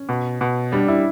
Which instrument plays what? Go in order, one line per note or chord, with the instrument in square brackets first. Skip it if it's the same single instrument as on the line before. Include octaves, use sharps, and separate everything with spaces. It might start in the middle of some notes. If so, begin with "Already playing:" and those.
Already playing: [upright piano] C#4
[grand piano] B2
B2
[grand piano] G3 [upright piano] D4
[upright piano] E4